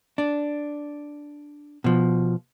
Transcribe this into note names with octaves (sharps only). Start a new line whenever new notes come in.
D4
B2 F3